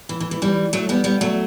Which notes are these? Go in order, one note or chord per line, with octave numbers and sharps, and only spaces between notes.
E3
E3
E3
E3 G3
F#3 A3
G3 B3
G3 B3
F#3 A3